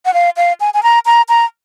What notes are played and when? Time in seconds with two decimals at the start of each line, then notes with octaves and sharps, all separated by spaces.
0.05 F#5
0.14 F5
0.37 F5
0.60 G#5
0.74 G#5
0.83 A#5
1.06 A#5
1.29 A#5